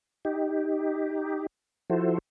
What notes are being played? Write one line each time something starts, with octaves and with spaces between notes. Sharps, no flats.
D#4 G4
F3 E4 F#4 A4 C5